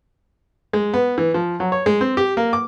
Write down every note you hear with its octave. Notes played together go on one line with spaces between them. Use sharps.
G#3
B3
E3
F3
F#3
C#5
G#3
C4
G4
A#3
D6